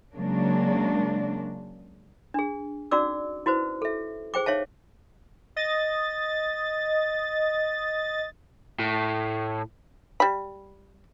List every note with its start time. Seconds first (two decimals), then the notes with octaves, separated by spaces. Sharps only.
0.15 C#3 F#3 G#3 A#3 D4
2.34 D4 G#4
2.91 C#4 D#4 F#4 D5 D6 E6
3.46 E4 F#4 B4 C5
3.82 A4 E5
4.34 G#4 C5 G5 D6
4.46 D#4 C#5 E5 F5 A5
5.56 D#5 A6
8.79 A2
10.20 G3 B5